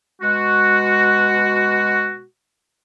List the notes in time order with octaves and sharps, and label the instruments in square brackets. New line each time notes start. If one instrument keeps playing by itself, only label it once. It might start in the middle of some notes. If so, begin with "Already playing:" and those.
[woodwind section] B2 G#3 F#4